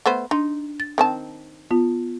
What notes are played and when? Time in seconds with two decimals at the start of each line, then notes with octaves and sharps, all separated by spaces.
0.06 A3 B3 C5
0.31 D4 D#4 C6
0.80 A6
0.98 D#3 C4 A5
1.71 B3 F4